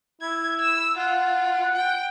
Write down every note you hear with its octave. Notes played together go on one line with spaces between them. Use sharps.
E4 G#6
E6
F4 F#5
G5